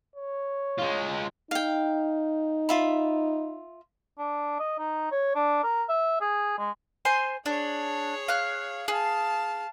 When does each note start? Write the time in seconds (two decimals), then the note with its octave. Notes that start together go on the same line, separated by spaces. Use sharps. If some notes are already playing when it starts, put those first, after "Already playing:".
0.16 C#5
0.78 G#3 F4
1.51 D#4 F5 G5
2.69 F4 E5 B5
4.18 D4
4.60 D#5
4.79 D#4
5.12 C#5
5.35 D4
5.63 A#4
5.89 E5
6.21 G#4
6.59 G#3
7.05 C5 G#5 C6
7.46 D4 G#4 C#5
8.28 F5 F#6
8.88 G#4 F5 A5